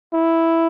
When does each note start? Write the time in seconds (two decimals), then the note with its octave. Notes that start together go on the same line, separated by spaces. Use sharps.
0.14 E4